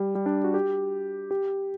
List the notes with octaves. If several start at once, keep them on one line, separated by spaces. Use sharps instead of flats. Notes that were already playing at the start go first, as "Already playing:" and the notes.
Already playing: G3
G3
D4
F#4
G4
G4